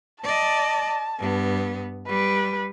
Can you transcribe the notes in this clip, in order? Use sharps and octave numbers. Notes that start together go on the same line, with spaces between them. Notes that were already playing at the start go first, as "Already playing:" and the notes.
D5 D#5 A5
G2 B3
G3 B4